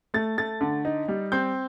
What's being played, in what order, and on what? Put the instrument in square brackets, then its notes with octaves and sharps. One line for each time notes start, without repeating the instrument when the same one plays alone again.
[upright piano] A3 A6
A3 A6
D3
D#4
G3
C4 G6